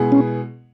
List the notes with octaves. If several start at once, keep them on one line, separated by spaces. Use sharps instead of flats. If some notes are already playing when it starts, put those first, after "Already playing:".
Already playing: B2 G#3 B3 E4 G#4
C#4